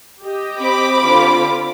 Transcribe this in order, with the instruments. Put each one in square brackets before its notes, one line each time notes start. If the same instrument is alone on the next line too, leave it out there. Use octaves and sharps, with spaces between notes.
[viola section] G4 D#5
[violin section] C4 B5 D6
[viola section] D3 F4